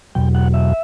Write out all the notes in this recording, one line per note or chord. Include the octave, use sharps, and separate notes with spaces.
E2 B2 F#3 G5
F#5
E5